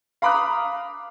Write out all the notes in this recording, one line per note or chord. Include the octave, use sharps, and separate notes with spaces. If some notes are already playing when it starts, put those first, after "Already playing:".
F5 A#5 B5 D6 D#6 F#6